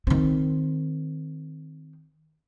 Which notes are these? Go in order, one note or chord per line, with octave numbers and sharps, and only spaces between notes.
D#3 C4